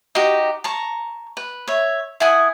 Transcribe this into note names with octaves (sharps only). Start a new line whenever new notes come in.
D#4 F#4 G4
A5 A#5 C#6
B4
C#5 E5
E4 F#5 G#5 D#6